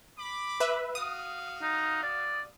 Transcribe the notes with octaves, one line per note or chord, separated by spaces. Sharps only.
B5 D6
B4 E5
F#4 F5 D#6
D#4
D5